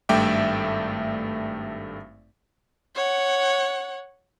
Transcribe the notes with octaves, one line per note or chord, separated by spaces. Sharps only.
G#1 G2 A3 E5 G5 D6
C#5 F#5